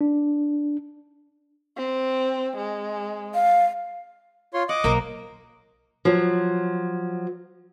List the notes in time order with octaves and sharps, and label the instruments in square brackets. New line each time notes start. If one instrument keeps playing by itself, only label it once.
[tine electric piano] D4
[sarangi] C4
G#3
[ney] F5
[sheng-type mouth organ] F4 C#5 C6
[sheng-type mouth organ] D#5 D6 [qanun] F#5
[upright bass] B1 [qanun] A#3 A#4 C5
[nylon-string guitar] F3 F#3